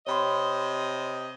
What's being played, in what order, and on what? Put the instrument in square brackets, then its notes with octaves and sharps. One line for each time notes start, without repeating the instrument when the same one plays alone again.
[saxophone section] C3 D#5 [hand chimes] C#5 B5 C6